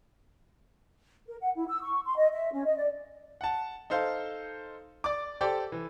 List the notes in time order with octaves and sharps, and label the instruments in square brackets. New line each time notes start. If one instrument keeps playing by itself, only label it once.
[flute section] A#4
F#5
E4
E6
C#6
C6
D#5
E5
C#4
D#5
D5
[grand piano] F#5 A5
D#4 A4 C5 F5
D5 D6
G4 A4 C5 D5
E3